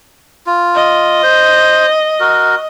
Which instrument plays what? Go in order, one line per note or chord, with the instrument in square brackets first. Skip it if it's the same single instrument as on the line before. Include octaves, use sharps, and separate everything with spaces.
[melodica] F4
[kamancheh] D#5
[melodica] C5
F#4 A#4